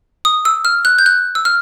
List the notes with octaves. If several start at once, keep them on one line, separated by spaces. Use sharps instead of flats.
D#6
E6
F6
F#6
G6
F#6
E6
F6